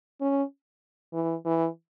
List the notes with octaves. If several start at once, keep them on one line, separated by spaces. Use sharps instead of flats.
C#4
E3
E3